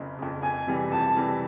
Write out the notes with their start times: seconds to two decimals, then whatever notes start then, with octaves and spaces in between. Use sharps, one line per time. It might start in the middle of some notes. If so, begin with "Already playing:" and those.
Already playing: F#1 F2 C#3
0.19 F2 C#3
0.43 F2 G#5
0.67 C3 E3 G3
0.92 F2 A5
1.16 C3 E3 G3